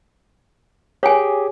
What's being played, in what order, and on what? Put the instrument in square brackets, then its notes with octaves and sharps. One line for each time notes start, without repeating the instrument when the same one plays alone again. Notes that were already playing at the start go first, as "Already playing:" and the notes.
[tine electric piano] G4 G#4 [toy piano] C#5 G#5